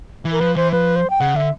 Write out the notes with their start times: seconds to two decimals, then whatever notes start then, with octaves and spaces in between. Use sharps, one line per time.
0.25 E3
0.32 A#4
0.40 F3 B4
0.56 E3 C5
0.72 F3 B4
0.96 C5
1.10 G5
1.20 C#3 F#5
1.34 D3 E5